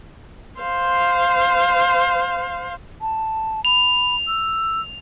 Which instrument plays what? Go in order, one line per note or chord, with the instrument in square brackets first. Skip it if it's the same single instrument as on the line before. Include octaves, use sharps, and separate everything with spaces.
[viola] C5 F5
[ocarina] A5
[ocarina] B5 [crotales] F7
[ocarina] E6